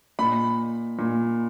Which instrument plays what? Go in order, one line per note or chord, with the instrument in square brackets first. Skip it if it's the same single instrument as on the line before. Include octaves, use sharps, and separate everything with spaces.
[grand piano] A#2 B5
A#2